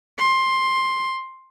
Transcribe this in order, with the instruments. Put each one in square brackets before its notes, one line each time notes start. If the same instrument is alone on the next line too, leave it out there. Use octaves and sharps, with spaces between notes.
[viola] C6